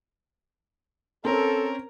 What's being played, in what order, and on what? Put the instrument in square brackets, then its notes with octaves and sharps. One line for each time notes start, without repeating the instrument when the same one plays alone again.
[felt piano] C4 C#4 [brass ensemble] A4 [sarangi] A#4